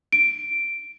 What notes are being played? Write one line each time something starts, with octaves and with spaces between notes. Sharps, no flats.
D7